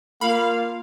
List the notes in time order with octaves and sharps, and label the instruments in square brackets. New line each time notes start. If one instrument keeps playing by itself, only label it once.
[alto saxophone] A#3 [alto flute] F4 [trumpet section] F5 [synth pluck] B5